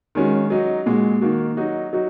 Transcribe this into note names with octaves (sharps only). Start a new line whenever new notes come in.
D#3 G#3 C#4 F#4
F#3 D#4 F#4
A#2 G#3 F#4
D#3 A#3 F#4
F#3 D#4 F#4
F#3 D#4 F#4